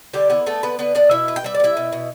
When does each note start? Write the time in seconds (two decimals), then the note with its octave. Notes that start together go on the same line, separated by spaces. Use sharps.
0.13 D3 G3 G4
0.30 B3 E4
0.46 A3 B3 A4
0.63 D3 B3 B4
0.79 D3 B3 B4
0.95 B3 D4 D5
1.11 B2 E4 E5
1.28 B3
1.36 G5
1.44 G3 E5
1.55 D5
1.60 B3
1.64 E4 E5
1.77 B2
1.93 B2